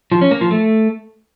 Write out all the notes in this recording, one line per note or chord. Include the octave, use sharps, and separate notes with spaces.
F3
C#4
A#3
F3
A3